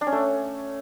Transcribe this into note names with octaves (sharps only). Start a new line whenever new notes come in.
D4
C#4
A3